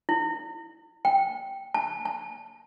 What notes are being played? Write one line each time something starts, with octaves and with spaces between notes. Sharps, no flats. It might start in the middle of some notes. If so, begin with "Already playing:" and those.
E4
G5
A5
A5